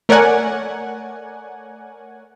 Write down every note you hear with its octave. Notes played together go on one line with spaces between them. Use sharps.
A3 A#4 C#5 D5 F#5 G#5